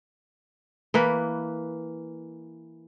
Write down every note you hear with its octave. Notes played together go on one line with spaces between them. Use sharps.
E3 A#3 B4